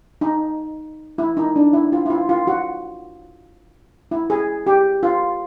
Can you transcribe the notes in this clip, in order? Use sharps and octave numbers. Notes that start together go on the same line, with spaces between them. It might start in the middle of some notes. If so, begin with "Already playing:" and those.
D#4
E4
D#4
D4
E4
F4
E4
F4
F4
F#4
E4
G#4
G4
F4